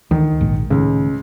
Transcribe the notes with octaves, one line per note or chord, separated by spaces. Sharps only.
D2 D#3
A#1 G#2
C#2 A2 D#3